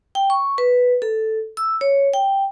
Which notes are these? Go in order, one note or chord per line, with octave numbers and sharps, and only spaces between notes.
G5
C#6
B4
A4
E6
C#5
G5